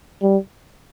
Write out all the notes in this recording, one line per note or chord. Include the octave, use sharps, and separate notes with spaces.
G3